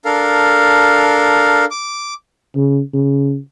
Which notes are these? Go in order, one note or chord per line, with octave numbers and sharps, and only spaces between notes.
D4 A4 A#4 F5
D6
C#3
C#3